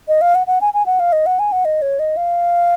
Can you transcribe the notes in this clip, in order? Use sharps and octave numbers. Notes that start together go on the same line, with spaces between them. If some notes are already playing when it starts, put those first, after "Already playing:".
D#5
F5
F#5
F#5
G#5
G#5
F#5
F5
D#5
F#5
G#5
F#5
D#5
C#5
D#5
F5